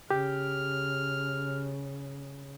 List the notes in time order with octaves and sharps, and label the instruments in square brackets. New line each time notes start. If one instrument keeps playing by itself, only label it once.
[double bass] C#3 [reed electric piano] G4 [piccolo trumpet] F6